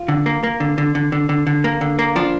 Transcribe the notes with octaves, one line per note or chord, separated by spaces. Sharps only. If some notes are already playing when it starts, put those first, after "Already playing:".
Already playing: F4
D3
A#3
A#3
D3
D3
D3
D3
D3
D3
A#3
D3
A#3
F3 D4